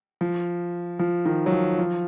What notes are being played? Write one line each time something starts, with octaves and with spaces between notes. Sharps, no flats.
F3
F3
D#3
F#3
F3
F3